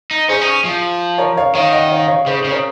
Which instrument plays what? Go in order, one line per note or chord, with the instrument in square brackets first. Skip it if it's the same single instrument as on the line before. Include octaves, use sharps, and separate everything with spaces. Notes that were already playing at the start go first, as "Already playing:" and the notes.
[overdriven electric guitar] D#4
[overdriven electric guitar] C#4 [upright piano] G#4 C5
[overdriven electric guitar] D#4
C#4
F3
[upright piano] A#4 C#5
C#5 F5
[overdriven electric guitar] D#3 [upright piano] C#5 F5
[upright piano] D#5 F#5
C#5 F5
C#5 F5
[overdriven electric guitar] C#3 [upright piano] G#4 C5
[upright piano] G#4 C5
[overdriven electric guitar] C#3
[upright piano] A#4 C#5